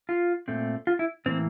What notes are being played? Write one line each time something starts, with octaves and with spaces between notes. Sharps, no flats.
F4
A#2 A3 C4
F4
E4
A2 E3 A#3 C4